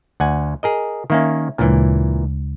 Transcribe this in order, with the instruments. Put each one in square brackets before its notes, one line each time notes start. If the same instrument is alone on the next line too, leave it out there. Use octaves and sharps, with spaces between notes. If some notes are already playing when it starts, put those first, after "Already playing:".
[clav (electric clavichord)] D2 F#5 G#5
G#4 A#4 D#5
[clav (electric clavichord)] D#3 A#3 C#4 [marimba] E5
[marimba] D2 C#3 G#3 [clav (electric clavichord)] A#2 E3